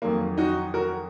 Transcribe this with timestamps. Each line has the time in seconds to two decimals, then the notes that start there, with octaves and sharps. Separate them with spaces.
0.02 F2 D#3 F#3 A#3
0.37 D#4 F#4
0.74 F#4 A#4